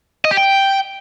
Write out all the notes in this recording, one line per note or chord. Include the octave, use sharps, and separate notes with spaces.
D#5
G4
G5